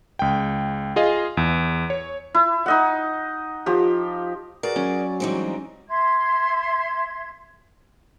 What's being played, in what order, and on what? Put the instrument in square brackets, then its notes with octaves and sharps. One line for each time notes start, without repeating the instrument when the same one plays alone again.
[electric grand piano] C#2 G5
F4 G#4 D#5 F5
E2
C#5
[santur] E4
D#4 D#5 F#5
F3 G4
[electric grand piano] F#4 G#4 A#4 [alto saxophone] B4 [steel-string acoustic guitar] D5
[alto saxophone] F#3 [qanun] C#4
[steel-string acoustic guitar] E3 G3 C4 [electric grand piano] G#3 D#4
[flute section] E5 C6 G#6